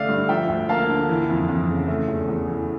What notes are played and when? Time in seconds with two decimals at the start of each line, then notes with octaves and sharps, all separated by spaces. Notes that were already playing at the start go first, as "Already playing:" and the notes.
Already playing: A1 D3 A3 D5 F5
0.09 G2
0.29 F3 E5 G5
0.49 D2
0.69 A#3 F5 A5
0.89 D3
1.09 E3
1.29 F2
1.49 F2
1.69 C#3
1.88 A3
2.08 E2
2.29 E2
2.48 E3